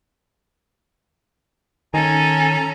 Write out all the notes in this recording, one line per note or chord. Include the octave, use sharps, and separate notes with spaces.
D#3 C#4 A4 G#5 A#5